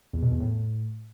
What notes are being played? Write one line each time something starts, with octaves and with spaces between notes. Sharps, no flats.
E2
B2
E2
A2